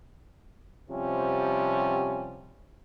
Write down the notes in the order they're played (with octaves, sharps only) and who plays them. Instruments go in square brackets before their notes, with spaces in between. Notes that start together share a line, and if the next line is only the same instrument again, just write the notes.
[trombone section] C3 F3 G3 C#4